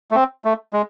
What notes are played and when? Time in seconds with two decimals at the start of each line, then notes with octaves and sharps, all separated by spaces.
0.11 A3
0.15 C4
0.45 A3
0.73 G#3